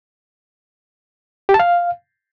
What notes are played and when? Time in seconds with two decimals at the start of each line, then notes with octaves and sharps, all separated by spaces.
1.49 G4
1.54 A5
1.59 F5